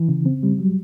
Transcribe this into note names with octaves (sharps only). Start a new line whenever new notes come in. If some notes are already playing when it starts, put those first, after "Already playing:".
Already playing: E3
C#3
C4
G3
F#3